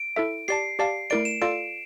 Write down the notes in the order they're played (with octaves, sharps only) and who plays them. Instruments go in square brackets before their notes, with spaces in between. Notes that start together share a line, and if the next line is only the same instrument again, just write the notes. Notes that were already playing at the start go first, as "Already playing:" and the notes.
Already playing: [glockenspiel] D7
[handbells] E4 A4 E5
[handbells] G4 D5 A5 [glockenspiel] C7
[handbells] G4 D5 F5 A5 [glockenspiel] C7
[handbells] A3 E4 A#4 D5 [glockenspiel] D7
[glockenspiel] E7
[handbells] F4 A4 D5 F5 [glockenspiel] D7